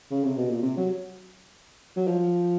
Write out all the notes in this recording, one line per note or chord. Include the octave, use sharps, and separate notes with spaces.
C#3
C3
B2
A#2
C3
F#3
F#3
F3